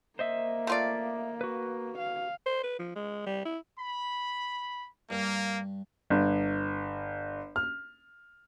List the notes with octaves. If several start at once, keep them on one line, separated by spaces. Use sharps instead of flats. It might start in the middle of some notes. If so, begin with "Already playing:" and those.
A#3 C5 D#5 E5
A3 F4 D5
F#4 B4
F5
C5
B4
F3
G#3
G3
E4
B5
G2 A#3
G1
F6